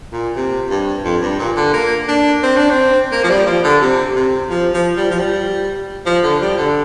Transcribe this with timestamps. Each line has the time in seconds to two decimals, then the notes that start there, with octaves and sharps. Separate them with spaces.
0.12 A#2
0.36 C3
0.70 G2
1.05 F2
1.22 G2
1.39 A#2
1.57 D3
1.74 A#3
2.08 D4
2.43 C4
2.57 D4
2.70 C4
3.12 A#3
3.24 F3
3.30 G3
3.47 F3
3.64 D3
3.81 C3
4.16 C3
4.50 F3
4.74 F3
4.97 G3
5.11 F3
5.20 G3
6.06 F3
6.23 D3
6.41 G3
6.58 D3